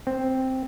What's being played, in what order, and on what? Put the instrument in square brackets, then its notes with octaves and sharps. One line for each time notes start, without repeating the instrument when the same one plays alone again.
[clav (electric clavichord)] C4